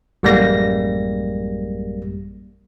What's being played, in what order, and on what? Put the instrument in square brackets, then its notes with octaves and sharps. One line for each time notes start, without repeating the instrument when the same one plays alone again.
[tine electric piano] A1 F#2 G3 G#3 A#3 A#6